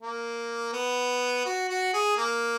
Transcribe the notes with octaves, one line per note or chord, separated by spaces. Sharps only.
A#3
B3
F#4
F#4
G#4
A#3